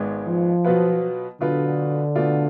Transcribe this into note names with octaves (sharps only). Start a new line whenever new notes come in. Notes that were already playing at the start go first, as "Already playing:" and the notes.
Already playing: G#1 G#2 G#3 B3
F3
B2 F#3 B3 F4 B4
B2 D3 F#3 B3 F4 B4
B2 A3 F4 B4 D5